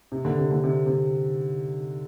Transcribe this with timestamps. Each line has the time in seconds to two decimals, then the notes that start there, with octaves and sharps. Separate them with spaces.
0.12 C3
0.25 D3
0.38 C3
0.52 D3
0.64 C3
0.87 C3